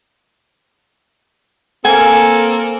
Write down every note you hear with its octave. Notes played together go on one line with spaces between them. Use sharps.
A#3 C4 A4 G#5